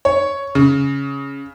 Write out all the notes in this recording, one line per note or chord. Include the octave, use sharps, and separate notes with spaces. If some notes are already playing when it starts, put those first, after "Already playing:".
C#5
C#3